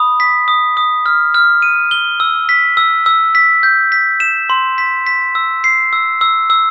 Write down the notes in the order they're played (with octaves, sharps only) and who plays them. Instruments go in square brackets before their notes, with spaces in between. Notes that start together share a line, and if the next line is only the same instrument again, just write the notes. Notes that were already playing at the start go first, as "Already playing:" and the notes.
Already playing: [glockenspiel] B5 D#6
B6
D#6
D#6
F6
F6
D#7
G7
E6
B6
E6
E6
B6
G6
B6
E7
C6
B6
B6
E6
C7
E6
E6
E6